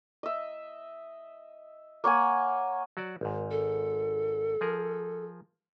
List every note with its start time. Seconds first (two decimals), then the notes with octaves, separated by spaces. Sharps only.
0.23 D#5 E5
2.04 A#3 C#5 F#5 G#5
2.97 F#3 F#4 D5
3.21 G#1 G#2
3.51 A4
4.61 F3 G#4 A#4